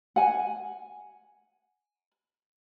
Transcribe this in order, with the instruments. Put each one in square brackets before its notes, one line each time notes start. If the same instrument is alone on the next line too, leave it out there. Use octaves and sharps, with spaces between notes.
[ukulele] F#5 G#5